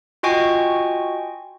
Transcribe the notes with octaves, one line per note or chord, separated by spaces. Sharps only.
F4 F#4 D#5 G5 G#5 C#6